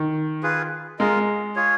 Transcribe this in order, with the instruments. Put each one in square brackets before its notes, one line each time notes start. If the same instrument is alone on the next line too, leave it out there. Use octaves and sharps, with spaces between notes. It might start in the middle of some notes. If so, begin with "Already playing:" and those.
Already playing: [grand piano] D#3
[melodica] F4 G#4 B4
[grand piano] G#3 [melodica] F4 A#4 D#5
[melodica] F4 G#4 C#5